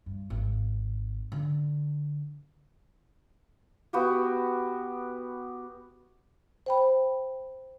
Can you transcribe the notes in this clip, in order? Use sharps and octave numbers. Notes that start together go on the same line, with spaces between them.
G2
G#1
D3
B3 F#4 G4
C5 G5 B5